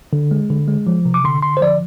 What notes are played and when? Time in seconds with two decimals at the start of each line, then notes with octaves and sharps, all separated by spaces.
0.13 D3
0.31 G#3
0.50 D3
0.68 G#3
0.87 F3
1.05 C3
1.14 D6
1.24 D3 C6
1.43 D3 C6
1.57 C5
1.61 F3 D5